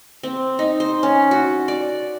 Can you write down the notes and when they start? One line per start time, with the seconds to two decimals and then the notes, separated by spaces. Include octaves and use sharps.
0.23 C4
0.59 D#4
0.80 C5
1.03 C#4
1.31 F#4
1.68 D5